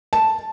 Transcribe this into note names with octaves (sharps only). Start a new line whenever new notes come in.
A5